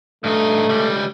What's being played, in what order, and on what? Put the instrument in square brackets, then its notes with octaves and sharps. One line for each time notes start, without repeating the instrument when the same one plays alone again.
[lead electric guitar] G2 D#4 [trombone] A3
[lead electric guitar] C#2 G3